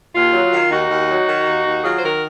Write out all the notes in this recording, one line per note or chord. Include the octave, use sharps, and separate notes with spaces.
D#2 F4
F#3
D#3
D#2 D#4 F#4
D#2
F#3
D#3
D#2
D#2
F#3 F4 G#4
C5
D#3 F#4 A#4